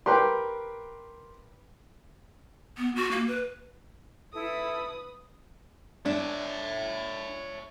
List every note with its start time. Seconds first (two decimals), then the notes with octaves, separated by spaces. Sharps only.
0.06 G4 A#4 B4 G5 C6
2.77 B3
2.96 F#4
3.11 A#3
3.28 B4
4.33 E4 A4 B4 D#6
6.06 D4 C#5 E5